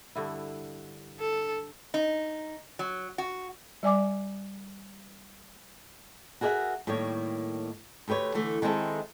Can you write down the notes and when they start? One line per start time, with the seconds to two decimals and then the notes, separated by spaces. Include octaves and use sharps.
0.15 G2 D3 E4
1.20 A4
1.94 D#4
2.79 F#3
3.18 F#4
3.83 G3 D5 G#5 D6
6.41 F#4 G#4 A#4 C#5 E5 F#5
6.87 A2 D#3 G3 A#3 C#5
8.08 D2 A3 G4 B4 C#5
8.34 D3 E3 A3
8.62 D#3 G#3 C4 D4 E4 A4